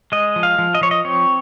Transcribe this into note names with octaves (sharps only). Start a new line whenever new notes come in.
G#3 D#5
F3
F5
F3
D#5
F3 C#5
D#5
C4 C#5